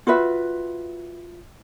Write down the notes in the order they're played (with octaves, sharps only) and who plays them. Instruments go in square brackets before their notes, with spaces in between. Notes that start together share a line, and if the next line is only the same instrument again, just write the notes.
[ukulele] F4 F#4 B4 E5